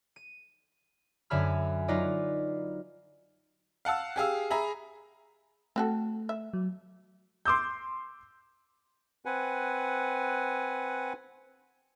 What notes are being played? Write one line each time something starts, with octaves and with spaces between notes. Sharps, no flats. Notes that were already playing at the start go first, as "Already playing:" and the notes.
D#7
F#2 D3 E5 G#5 B5 F6
F#3 D#4 F4 B4 D5 D#5
F5 F#5 A5 E6
G4 G#4 F5 E6
G#4 E5 A#5 B5
A3 C4 F#4 A4
E5
F#3
C6 D6 E6 G6
C4 B4 F#5 G#5